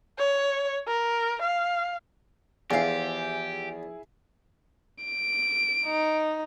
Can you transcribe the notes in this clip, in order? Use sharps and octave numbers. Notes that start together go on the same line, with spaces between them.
C#5
A#4
F5
E2 F3 E4 G4 G#4 F5
D7
D#4